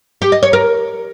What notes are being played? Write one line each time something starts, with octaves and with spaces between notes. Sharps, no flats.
G4
D#5
C#5
A#4